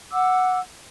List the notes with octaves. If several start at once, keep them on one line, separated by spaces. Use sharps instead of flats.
F#5 D6 E6